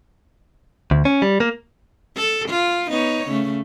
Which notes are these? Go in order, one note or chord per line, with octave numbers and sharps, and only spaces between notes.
D2
C#4
G3
A#3
A4
F4
B3 D#4 C#5
C#3 A3